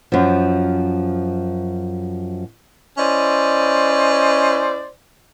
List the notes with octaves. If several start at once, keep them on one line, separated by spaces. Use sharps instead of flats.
F#2 F3
C#4 E4 C5 D5 D#5